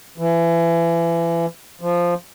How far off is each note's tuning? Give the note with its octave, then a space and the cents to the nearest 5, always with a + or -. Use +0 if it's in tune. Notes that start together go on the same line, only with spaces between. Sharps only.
E3 +30
F3 -5